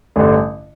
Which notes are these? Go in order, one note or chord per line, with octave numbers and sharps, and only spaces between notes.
A1 G2 D3